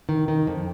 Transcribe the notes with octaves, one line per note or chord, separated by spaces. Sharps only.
D#3
D#3
F2